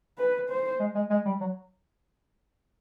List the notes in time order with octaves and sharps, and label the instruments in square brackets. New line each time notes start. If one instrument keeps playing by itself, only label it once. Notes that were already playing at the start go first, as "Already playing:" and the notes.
[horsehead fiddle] B4
C5
[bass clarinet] G#3
G#3
G#3
G3
F#3